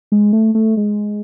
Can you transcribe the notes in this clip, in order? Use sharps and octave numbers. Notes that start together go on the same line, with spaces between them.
G#3
A3
A3
G#3